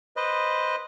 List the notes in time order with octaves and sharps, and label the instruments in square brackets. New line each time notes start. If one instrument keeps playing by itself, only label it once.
[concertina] B4 C5 D#5